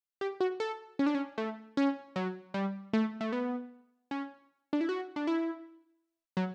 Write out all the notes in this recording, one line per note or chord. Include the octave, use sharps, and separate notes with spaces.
G4
F#4
A4
C#4
D4
C#4
A3
C#4
F#3
G3
A3
A3
B3
C#4
D4
E4
F#4
D4
E4
F#3